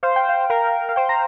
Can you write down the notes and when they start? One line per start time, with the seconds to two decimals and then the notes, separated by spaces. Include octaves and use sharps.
0.03 C5 F5
0.16 G5
0.29 F5
0.50 A#4 F5
0.89 F5
0.96 C5 G5
1.09 A#5